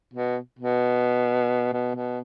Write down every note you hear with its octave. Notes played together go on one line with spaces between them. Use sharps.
B2
B2
B2
B2